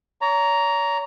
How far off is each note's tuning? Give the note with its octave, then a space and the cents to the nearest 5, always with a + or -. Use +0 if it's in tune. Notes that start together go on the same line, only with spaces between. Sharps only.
C#5 +40 A#5 +0